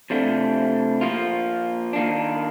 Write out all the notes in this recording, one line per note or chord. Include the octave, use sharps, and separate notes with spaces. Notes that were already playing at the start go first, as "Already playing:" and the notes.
C3 F3 A3 D4
F3 A#3 F4
D#3 A#3 D4